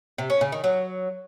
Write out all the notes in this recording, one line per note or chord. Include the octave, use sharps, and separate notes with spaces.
C3
C#4
C#3
D#3
F#3